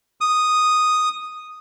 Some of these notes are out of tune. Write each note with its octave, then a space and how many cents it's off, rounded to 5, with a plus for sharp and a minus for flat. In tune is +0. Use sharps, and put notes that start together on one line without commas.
D#6 -5